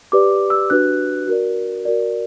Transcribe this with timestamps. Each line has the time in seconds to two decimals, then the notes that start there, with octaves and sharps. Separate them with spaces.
0.12 G4 B4 D5 D6
0.50 E6
0.70 D4 F#4 B4 F#6
1.28 F#4 A#4 D5
1.85 F#4 A#4 D5